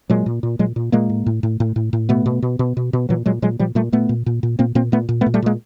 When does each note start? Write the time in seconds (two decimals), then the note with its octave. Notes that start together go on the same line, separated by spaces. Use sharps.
0.10 A#2 F#3 G#3
0.26 A#2
0.43 A#2
0.59 A#2 F#3 G#3
0.76 A#2
0.92 A#2 G#3 A#3
1.10 A2
1.26 A2
1.43 A2
1.60 A2
1.76 A2
1.93 A2
2.09 B2 A3 B3
2.26 B2
2.42 B2
2.59 B2
2.77 B2
2.93 B2
3.09 A#2 E3 F#3
3.26 A#2 F#3 G#3
3.42 A#2 F#3 G#3
3.59 A#2 F3 G3
3.75 A#2 G3 A3
3.92 A#2 A3 B3
4.09 A#2
4.26 A#2
4.43 A#2
4.59 A#2 A#3 C4
4.75 A#2 A#3 C4
4.92 A#2 A3 B3
5.09 A#2
5.21 A3 B3
5.26 A#2
5.34 G3 A3
5.42 A#2 G#3 A#3